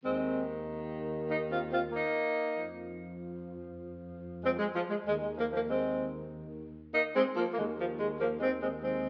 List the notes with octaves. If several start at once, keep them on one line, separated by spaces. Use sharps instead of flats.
D#2 D#3 G#3 C4
A#3 D#4
C4 F4
C4 F4
A#3 D#4
F2 F3
G#3 C4
G#3
F3
G#3
D#2 D#3 G#3
G#3
F3 A#3
F3 A#3
G#3 C4
A#3 D#4
G#3 C4
F3 A#3
A#3
D#2 D#3 G#3
F3
G#3
F3 A#3
G#3 C4
G#3 C4
G#3 C4